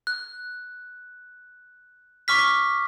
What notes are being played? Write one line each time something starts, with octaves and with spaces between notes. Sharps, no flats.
F#6
C#6 D6 F6 B6